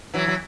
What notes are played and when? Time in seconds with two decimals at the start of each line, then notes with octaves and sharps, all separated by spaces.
0.14 E3 F#3
0.28 F#3